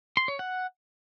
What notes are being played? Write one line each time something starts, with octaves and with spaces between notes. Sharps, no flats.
C6
C#5
F#5